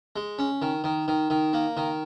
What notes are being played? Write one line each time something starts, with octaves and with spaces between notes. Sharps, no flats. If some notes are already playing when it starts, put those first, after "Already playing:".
G#3
C#4
D#3
D#3
D#3
D#3
A#3
D#3